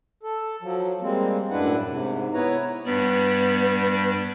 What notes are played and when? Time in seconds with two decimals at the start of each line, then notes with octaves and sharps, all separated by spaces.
0.23 A4
0.62 F3 F#3
1.01 G3 G#3 A#3 C4
1.50 F#2 A2 D4 E4 B4 F#5
1.85 G#2 C3
2.33 B3 E4 B4 C#5 A#5
2.86 G2 G3 B3 B4